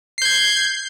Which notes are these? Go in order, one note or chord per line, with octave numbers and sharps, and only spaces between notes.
G6 G#6 C7